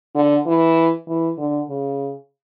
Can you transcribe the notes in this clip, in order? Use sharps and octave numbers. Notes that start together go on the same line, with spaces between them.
D3
E3
E3
D3
C#3